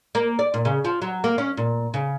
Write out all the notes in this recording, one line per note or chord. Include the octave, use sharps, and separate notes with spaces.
A#3
D5
A#2
C#3
F3
F#3
A#3
C#4
A#2
C#3